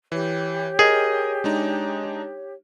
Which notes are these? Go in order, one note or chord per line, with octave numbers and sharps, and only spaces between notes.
E3 G4 C#5
G#4 A#4 D#5
G#3 D4 D#4